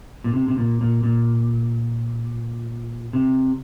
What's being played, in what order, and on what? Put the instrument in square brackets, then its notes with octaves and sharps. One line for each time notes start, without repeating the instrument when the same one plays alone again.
[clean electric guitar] A#2
C3
C3
A#2
A#2
A#2
C3